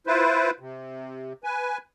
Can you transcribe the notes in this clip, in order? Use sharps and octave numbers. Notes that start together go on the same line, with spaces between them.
E4 F4 B4 C5
C3
B4 G#5